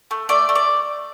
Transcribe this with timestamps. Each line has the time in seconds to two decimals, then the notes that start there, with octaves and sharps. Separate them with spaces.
0.11 A3
0.29 A3 D5
0.49 A3
0.55 D5